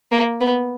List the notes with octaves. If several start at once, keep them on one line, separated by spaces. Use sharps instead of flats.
A#3
B3